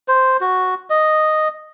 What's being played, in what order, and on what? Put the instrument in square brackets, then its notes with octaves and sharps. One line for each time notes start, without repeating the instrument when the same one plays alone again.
[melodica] C5
F#4
D#5